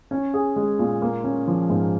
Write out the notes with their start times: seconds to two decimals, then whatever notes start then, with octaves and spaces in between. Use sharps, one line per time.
0.11 C#4
0.34 G#4
0.56 G#3
0.79 A#2
1.02 A#3
1.24 C#4
1.47 F3
1.70 G#2